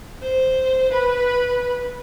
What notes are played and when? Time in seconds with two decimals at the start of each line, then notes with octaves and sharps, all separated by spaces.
0.22 C5
0.91 B4 B5